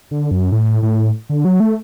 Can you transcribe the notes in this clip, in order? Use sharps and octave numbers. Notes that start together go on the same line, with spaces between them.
D3
F#2
A2
A2
D3
F#3
A3